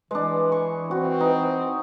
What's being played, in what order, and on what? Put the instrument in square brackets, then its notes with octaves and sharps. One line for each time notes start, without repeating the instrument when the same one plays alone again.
[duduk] E3 [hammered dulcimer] G#3 D4 [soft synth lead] B4
[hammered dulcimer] C#6
[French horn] C4 [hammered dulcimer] F#4
[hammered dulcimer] D#4